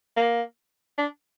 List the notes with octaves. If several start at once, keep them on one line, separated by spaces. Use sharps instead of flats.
A#3
D4